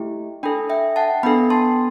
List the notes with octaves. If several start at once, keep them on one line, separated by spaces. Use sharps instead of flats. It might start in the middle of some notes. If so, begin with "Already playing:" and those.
Already playing: A3 E4 G4
D4 A4 G5 B5
E5 G5
F#5 A5
B3 D4 A4 G5 B5
A5 C6